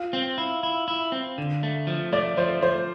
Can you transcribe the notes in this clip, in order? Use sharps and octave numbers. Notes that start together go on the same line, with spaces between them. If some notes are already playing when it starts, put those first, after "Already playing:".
Already playing: F4
C4
E4
E4
E4
C4
D3
A3
F3
A3 D5
F3 C5
F3 C5